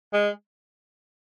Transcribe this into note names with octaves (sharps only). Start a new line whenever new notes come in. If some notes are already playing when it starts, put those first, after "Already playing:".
G#3